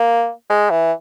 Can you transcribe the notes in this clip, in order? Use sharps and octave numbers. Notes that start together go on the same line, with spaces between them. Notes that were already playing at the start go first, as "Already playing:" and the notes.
Already playing: A#3
G#3
E3